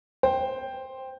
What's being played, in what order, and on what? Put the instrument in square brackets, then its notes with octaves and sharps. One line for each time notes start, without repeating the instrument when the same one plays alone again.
[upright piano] C5 G5